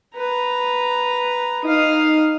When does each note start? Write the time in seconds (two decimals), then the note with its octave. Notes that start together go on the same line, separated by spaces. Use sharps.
0.16 B4 A#5
1.64 D#4 F5 D#6